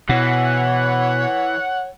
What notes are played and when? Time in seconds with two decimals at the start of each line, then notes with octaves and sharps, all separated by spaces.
0.09 B2 E3 C#5 F#5